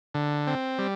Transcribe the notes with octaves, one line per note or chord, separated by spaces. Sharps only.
D3
C4
G3